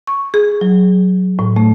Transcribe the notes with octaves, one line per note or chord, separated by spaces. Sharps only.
C#6
G#4
F#3
A2
A3